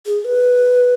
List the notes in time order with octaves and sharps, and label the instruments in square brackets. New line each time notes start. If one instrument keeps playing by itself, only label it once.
[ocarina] G#4
B4